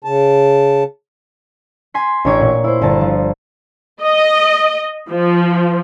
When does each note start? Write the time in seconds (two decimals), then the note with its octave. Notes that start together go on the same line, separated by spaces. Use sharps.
0.04 C#3 A5
1.94 G#5 C6 B6
2.25 A1 D4 C#5 D6 G#6 D7
2.40 A#2
2.64 E4 C5
2.82 G1 A5 A6
3.01 F3
4.02 D#5
5.10 F3